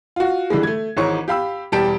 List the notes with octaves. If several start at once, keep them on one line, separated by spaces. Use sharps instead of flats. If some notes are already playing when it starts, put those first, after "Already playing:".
F4 F#4
D3 E3 G3 G#3
A3 G#6
G#1 G#2 E3 D#4 C#5 C#6
G4 F5 B5 E6
E1 G3 G4 A5 D7